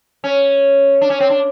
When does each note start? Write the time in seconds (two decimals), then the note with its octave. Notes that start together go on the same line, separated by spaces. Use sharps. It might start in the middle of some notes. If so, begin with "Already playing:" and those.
0.24 C#4
1.01 D4
1.10 C#4
1.20 C4
1.30 D4